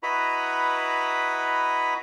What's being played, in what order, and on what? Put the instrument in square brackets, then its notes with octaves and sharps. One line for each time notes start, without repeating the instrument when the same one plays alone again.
[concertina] E4 F#4 B4 D#5 A#5 B5